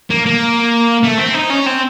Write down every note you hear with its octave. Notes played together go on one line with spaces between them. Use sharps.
A#3
A#3
A3
C4
D#4
C#4
C4